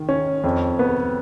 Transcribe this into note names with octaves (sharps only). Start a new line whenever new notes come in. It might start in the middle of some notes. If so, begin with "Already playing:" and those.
Already playing: D#3
C#4
F2
B3